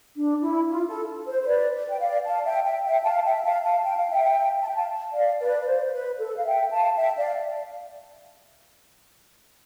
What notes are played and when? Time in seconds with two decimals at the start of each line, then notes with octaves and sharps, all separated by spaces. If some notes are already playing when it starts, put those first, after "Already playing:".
0.16 D4
0.42 E4
0.68 F4
0.87 A4
1.27 C5
1.41 C5
1.46 B4 D5
1.89 G5
1.99 D5 F5
2.25 F5 A5
2.45 E5 G5
2.64 E5 G5
2.85 E5 G5
3.04 F5 A5
3.15 A5
3.24 E5 G5
3.39 G5
3.43 F5 A5
3.63 F5 A5
3.83 G5
3.96 F5
4.10 E5 G5
4.61 A5
4.69 G5
4.75 F5 A5
5.13 D5 F5
5.40 B4 D5
5.59 B4
5.66 C5
5.85 C5
5.92 B4
6.18 A4
6.36 F5
6.44 E5 G5
6.70 F5 A5
6.97 E5 G5
7.17 D5 F5